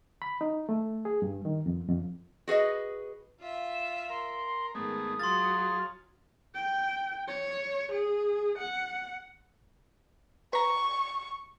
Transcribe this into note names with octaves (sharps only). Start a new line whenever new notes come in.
B5
D#4
A3
G#4
G2
D#3
F2
F2
F#4 G#4 B4 D#5
F4 E5
E7
A#4 C6
G#2 D#3 A3 B3 G#4 D#6
F#3 F4 G#4 F5 C6 A6
G5
C#5
G#4
F#5
B4 A#5 C#6